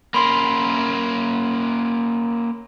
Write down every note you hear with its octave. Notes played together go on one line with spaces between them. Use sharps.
A#3 C#4 A#4 B5 C6